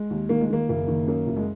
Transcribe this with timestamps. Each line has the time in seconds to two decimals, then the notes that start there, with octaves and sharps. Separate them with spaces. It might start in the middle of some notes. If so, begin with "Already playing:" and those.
Already playing: G#3
0.10 D#2
0.29 D#3 A#3
0.41 G#3
0.50 D#3 A#3
0.69 F#1 A#3
0.88 D#3
1.07 F#2 A#3
1.27 F#1
1.36 G#3